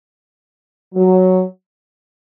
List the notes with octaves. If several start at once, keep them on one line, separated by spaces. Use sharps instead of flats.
F#3